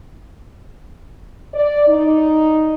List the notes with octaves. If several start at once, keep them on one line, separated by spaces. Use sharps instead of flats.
D5
D#4